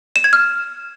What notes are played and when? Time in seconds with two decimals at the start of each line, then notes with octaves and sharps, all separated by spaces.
0.16 E7
0.24 G#6
0.33 F6